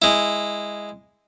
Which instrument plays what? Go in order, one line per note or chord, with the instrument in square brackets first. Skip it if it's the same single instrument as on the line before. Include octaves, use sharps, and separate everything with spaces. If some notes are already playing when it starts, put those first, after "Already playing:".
[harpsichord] G#3 E4